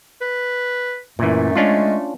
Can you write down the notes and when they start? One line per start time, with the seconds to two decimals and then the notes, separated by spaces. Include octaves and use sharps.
0.21 B4
1.19 F#2 A#2 E3 A3
1.56 G#3 C#4 D4 F4